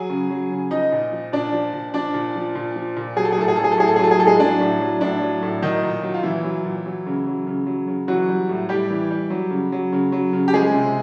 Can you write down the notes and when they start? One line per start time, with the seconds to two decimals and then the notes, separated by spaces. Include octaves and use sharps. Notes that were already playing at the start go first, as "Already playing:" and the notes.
Already playing: F#3 G#4 G#5
0.10 C#3
0.30 F#3
0.51 C#3
0.71 F3 D#4 D#5
0.92 A#2
1.12 F3
1.33 A#2 D4 D5
1.53 F3
1.73 A#2
1.94 F3 D4 D5
2.14 A#2
2.35 F3
2.55 A#2
2.76 F3
2.97 A#2
3.16 F#3 G#4
3.25 A4
3.32 G#4
3.38 A2 A4
3.48 G#4
3.56 F#3 A4
3.64 G#4
3.72 A4
3.78 A2 G#4
3.88 A4
3.96 G#4
3.99 F#3 A4
4.11 G#4
4.19 A2 A4
4.27 G#3 G#4
4.40 F#3 D4
4.61 A2
4.80 F#3
5.01 A2 D4
5.21 F#3
5.42 A2
5.62 D#3 F#3 D#4
5.83 A#2
6.03 F#3
6.14 F4
6.23 A#2 E3 E4
6.44 F#3
6.64 A#2
6.86 F#3
7.06 C#3
7.27 F#3
7.47 C#3
7.66 F#3
7.87 C#3
8.07 E3 F#3 F#4
8.29 G3
8.49 A2
8.69 A2 G3 G4
8.90 E3
9.11 G3
9.30 F#3
9.51 C#3
9.72 F#3
9.93 C#3
10.12 F#3
10.33 C#3
10.48 G4
10.54 F3 G#3 G#4
10.74 C3